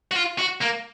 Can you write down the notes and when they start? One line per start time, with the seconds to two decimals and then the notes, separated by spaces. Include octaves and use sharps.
0.12 F#4
0.16 F4
0.39 F#4
0.62 A#3